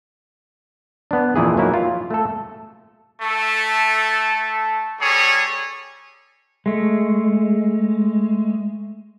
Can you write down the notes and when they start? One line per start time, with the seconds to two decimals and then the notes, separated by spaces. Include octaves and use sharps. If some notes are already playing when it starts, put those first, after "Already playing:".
1.11 B3 D4
1.35 F2 A#2 E3 E4 G#4
1.57 F#3 A#3 D#4 E4
1.74 F4
2.10 A3 A4
3.21 A3 A4
5.01 G3 C#4 G#4 A4 C#5
6.66 G#3 A3